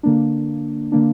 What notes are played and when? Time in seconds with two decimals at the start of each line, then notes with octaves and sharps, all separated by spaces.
0.03 D3 A#3 D4
0.92 D3 A#3 D4